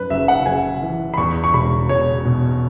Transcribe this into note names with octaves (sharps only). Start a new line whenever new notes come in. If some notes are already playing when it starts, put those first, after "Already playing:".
Already playing: F#2 B4
F#1 E5
F#5
F#1 G#5
E3
B5
E2 C#6
C#6
E1 B5
E1 C#5
B2